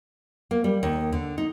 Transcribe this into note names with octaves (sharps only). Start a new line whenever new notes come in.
A#3
G3
D#2
D3
D#4